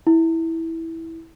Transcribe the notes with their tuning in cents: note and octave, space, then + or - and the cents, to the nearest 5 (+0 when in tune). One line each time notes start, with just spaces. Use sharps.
E4 -10